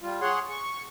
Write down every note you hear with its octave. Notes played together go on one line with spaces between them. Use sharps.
G3 F4
G#4 C#5 F#5 C6
C#6